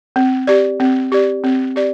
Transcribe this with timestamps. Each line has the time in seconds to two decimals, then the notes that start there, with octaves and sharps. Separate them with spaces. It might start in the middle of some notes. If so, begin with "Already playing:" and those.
0.16 C4
0.47 G4 D5
0.80 C4
1.12 G4 D5
1.44 C4
1.76 G4 D5